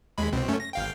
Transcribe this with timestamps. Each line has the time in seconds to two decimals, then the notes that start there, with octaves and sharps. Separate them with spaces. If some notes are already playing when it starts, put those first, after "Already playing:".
0.18 D#2 G#3 B5
0.32 C2 B2 C4
0.48 F#2 A3 C#4
0.60 A#6
0.73 G1 F5 G5